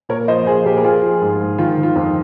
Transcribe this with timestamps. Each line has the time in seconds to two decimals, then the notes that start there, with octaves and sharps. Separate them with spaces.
0.09 A#2 A#4 C#5
0.28 F3 C5 D#5
0.46 F3 G#4 C5
0.65 A#2 G4 A#4
0.78 A#4
0.84 F3 F4 G#4
1.02 F3
1.21 G#2
1.40 G#2
1.58 D#3 F4
1.77 D#3
1.83 F4
1.95 F2